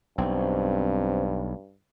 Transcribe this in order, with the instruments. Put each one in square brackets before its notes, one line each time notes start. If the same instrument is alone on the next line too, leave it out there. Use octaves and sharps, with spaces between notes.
[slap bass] B1 [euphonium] G2 [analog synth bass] C4